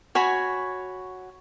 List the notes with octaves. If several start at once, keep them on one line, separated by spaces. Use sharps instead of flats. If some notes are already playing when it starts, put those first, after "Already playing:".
F#4 C#5 G#5 B5